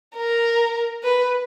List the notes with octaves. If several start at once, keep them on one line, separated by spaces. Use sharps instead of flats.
A#4
B4